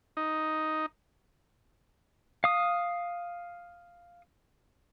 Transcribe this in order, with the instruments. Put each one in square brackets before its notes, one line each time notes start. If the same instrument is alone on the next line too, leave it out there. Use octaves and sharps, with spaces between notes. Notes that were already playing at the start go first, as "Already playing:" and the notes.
[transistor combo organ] D#4
[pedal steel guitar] F5 D#6